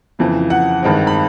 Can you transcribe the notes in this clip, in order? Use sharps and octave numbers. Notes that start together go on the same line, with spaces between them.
F2 C#3 E3
F#5
G2 D#3 G#3 C4
B5